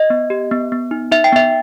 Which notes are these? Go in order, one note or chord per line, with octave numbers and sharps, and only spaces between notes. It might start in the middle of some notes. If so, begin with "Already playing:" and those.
Already playing: D#5
B3
G4
B3
B3
D#4
D#4 E5
G5
B3 E5